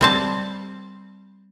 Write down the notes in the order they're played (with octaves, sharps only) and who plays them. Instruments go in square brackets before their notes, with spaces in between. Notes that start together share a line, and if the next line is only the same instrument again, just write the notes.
[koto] G3 C4 A5